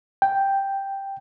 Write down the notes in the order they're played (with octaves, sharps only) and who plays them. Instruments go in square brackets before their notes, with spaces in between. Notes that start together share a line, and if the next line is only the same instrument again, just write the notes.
[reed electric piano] G5